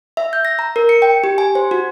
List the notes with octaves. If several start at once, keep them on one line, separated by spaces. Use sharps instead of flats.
E5
G6
A#6
A#5
A#4
C#7
G5
G4
G#5
C5
F#4